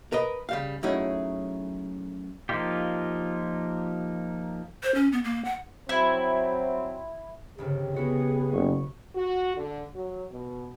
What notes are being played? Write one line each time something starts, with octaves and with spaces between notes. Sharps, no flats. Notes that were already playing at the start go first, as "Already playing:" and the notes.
A#4 B4 D#5
C#3 G3 F5
F#3 A3 C#4 D#4 E4 G#4
F3 A#3 D#4 F4 G4
C5
C#4
B3
A#3
F#5
F#3 C4 E4
G1 C2 C#3 G4
B3 E4 F#4 G#4 D#5
F#1 C#6
F#4
D3
F#3
B2